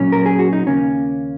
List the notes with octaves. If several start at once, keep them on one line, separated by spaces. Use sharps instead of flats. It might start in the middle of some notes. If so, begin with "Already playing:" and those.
Already playing: A#2 F#3 A#3 C#4
A#4
G#4
F#4
D#4
D#2 C#3 A#3 C#4